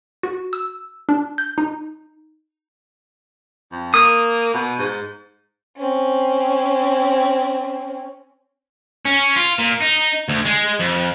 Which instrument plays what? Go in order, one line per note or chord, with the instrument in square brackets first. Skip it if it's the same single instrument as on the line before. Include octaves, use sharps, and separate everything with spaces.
[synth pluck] F#4
E6
D4
G6
D#4
[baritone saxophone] F2
[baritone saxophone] A#3 [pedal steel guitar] D#6
[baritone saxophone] B2
G#2
[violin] C4 C#4
[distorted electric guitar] C#4
F4
A#2
D#4
D2
G#3
F2